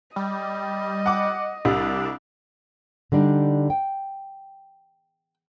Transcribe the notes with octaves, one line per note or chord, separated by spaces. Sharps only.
G3 D#5
F#5 D6
C2 G3 D4
D3 G3 D4 D#4
G5